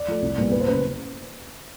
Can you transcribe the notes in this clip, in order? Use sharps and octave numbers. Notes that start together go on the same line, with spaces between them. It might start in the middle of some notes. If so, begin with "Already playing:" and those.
Already playing: D5
F3 A3
C2
A#2 G3 B3
F#1 B4
C5
F#2 C#3 B4